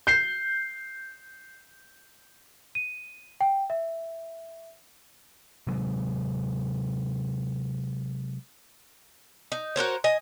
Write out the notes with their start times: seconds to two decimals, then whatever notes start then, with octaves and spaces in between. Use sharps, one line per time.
0.07 G6 C7
2.75 D#7
3.41 G5
3.70 E5
5.67 C3 F#3 G#3
9.52 D#4
9.76 F#4 A#4 C5 C#5
10.04 D#5 G#5